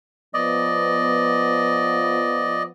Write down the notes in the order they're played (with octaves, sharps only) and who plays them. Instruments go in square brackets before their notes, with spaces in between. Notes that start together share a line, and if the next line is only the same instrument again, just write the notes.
[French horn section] F3 B3 [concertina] D5 D#5